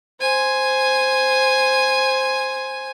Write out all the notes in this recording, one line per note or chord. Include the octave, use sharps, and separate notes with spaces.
C5 G#5